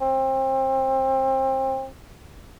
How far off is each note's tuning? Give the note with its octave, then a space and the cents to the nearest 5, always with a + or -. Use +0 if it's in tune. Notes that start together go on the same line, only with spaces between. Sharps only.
C4 +30